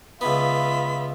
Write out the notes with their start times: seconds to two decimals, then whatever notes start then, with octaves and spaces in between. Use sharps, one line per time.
0.21 C#2 B3 F4 E5 B5